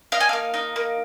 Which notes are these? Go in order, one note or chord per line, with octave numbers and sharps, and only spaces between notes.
D#4 F5
G#5
A#3 F5
D#4
A#3